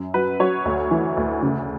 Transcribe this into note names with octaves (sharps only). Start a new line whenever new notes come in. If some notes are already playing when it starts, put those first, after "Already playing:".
Already playing: F#2
F#3 B4
F#3 C#5
D2
E3
D2
C#3